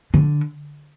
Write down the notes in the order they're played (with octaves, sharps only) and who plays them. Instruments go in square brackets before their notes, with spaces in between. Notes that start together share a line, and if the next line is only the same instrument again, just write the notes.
[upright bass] D3